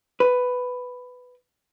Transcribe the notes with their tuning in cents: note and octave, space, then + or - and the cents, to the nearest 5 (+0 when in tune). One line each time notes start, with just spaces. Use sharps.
B4 +10